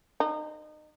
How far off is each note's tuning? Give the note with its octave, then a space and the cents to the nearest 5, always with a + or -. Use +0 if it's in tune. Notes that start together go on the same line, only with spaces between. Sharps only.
D#4 -30